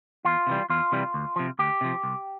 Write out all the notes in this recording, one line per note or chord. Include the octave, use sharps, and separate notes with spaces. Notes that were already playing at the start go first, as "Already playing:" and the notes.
E2 F4
C3 E3 G3
E2 F4
C3 E3 G3
D2
C3 F3
D2 G4
C3 F3
C2